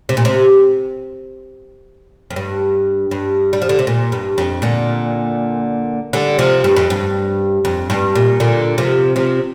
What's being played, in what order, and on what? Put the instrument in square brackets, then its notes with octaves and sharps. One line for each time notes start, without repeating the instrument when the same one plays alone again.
[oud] C3
A#2
C3
F2
G2
G2
G3
F3
D3
C3
A#2
G2
F2
A#2 D3
D3 G3
C3 F3
G2
F2
G2
F2
G2
A#2
A#2 D3
C3 F3
C3 F3